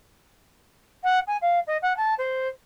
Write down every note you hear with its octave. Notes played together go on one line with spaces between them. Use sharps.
F#5
G#5
F5
D#5
F#5
A5
C5